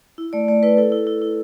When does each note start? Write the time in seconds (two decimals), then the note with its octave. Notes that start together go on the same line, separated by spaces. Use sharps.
0.18 E4
0.33 A3 D5
0.48 A3 D5
0.63 E4 B4
0.77 E4 A4
0.92 E4
1.07 E4
1.22 E4